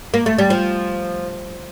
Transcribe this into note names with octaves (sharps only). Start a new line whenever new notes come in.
A#3
A3
G3
F3